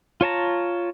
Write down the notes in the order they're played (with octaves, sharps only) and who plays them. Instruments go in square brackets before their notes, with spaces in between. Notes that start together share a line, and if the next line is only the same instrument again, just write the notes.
[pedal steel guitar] F4 C#5 A5 A#5